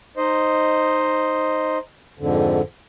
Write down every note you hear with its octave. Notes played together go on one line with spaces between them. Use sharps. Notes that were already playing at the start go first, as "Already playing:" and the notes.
D#4 C5 D#5
F2 G#2 D3